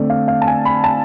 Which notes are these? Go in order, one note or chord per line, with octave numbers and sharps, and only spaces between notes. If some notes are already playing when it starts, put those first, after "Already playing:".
Already playing: D3 A3 C4 D5
F5
F5
A5
G#5
B5
A5